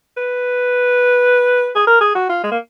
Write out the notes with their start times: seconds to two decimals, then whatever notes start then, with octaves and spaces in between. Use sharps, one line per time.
0.17 B4
1.76 G#4
1.87 A#4
2.01 G#4
2.15 F#4
2.30 F4
2.44 G#3
2.52 A#3